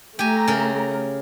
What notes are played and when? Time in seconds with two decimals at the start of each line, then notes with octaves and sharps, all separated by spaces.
0.19 A3 G4 G#5 A#5
0.48 C#3 A#4